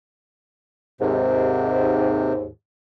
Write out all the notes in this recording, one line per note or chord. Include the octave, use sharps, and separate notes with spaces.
D#2 G#2 C3